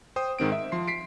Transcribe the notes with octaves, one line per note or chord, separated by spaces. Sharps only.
C5 G5 D#6
G#2 D#3 C4 D7
E5
F3 C6 C7
B6 C7 D7